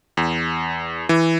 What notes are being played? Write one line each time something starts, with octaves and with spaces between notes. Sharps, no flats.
E2
E3